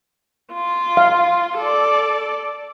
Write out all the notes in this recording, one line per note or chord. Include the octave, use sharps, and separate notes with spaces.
F4
F5
A4 D5